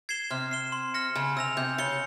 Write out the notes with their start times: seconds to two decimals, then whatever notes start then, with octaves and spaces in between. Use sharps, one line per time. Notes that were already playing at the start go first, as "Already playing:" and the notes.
0.09 G#6 C7 E7 G7
0.30 C3 F6
0.51 C7 E7 G7
0.72 C6
0.94 F6 A#6 C#7
1.15 C#3 G#5
1.37 C3 E6 A#6 F7
1.57 C3 G6
1.78 C#3 C#7 G7